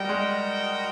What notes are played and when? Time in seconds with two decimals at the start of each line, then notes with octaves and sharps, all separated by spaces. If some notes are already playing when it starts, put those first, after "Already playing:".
Already playing: G3 F#4 A#4 D#5 G5
0.09 G#3